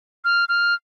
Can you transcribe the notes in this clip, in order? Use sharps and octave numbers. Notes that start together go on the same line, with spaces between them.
F6
F6